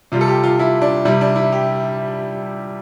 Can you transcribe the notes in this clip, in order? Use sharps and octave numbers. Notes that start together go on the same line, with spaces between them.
C3 G3 F4
A4
G4
F4
E4
D4
C3 G3 E4
D4
E4
G4